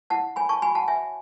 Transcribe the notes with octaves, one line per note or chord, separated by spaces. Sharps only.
E4 F#5 A5
C#5 G#5 B5
A5 C#6
F#4 G#5 B5
F#5 A5
C#5 E5 G#5